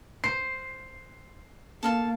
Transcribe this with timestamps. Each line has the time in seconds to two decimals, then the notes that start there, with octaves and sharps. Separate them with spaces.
0.24 C5 C7
1.83 A#3 A4 F5 A5